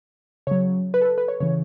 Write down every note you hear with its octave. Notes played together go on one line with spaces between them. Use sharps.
C#3 F#3 C#5
B4
A4
B4
B4
C#5
C#3 E3 C#5